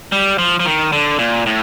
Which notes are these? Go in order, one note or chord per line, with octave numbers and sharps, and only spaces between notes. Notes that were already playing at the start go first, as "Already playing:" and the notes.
G3
F3
F3
D#3
D3
A#2
A2